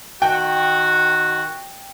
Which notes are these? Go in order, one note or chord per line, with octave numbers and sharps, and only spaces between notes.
D#3 F#4 G5